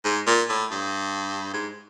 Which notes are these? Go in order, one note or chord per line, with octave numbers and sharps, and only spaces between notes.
G#2
A#2
A2
G2
G#2